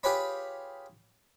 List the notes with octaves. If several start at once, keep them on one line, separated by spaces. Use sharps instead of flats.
F4 G4 G#4 B4 C#5 B5